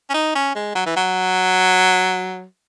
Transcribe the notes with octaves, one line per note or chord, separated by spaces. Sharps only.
C#4
D#4
C#4
G#3
F#3
E3
F#3